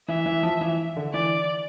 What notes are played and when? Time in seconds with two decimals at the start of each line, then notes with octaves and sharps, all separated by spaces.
0.08 E3 E5
0.26 E3
0.43 F3
0.61 E3
0.96 D3
1.13 E3 D5